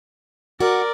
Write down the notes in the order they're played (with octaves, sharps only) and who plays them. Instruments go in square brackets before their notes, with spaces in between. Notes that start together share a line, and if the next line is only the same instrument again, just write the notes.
[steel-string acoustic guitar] F#4 [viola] A#4 D5